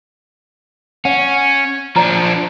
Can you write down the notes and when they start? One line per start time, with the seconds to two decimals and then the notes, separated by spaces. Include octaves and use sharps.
1.05 C#4 F#5
1.96 F3 D4 A#5